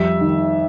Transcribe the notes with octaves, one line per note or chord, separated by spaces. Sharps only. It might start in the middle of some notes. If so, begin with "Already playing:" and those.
Already playing: F2 G3 E5
D#3